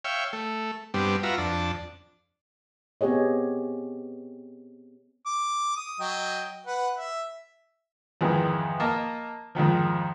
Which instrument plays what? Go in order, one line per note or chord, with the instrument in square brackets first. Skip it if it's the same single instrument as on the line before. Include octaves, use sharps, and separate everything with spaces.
[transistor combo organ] C#5 E5 F5 G5
A3
G2 G3 B3 C4 D4
F4 F#4 B4 E5 A#5
F2 D4 A5
[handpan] B3 C4 G4 G#4 C#5 D#5
[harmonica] D6
D#6
F#3 D#5 G5
B4 F#5
E5
[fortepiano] F2 G#2 D#3 E3 G#3
A#3 D#5 A5
F2 G#2 D#3 F3